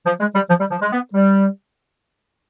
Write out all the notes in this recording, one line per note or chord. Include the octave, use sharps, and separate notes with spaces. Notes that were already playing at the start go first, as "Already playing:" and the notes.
F3
G#3
G3
F3
G3
F3
G#3
B3
G3